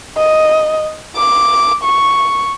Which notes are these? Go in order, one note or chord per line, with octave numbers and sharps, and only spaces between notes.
D#5
D6
C#6